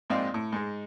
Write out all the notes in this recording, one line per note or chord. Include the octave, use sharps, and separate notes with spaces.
A#1 G#2 C4 D5 D#5 F5
A2
G#2 G#3